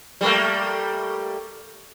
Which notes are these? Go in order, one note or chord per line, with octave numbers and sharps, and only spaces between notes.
G3 A3 A#3